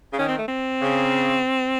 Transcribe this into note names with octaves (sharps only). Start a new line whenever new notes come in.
C#3
D#3 C#4
C4
A3
C4
C#3